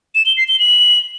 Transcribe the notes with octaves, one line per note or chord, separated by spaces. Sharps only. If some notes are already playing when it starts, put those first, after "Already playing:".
E7
G7
C7
G7
F#7